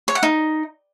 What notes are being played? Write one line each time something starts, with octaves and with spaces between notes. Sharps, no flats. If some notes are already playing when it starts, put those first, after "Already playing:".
C#5
F#5
D#4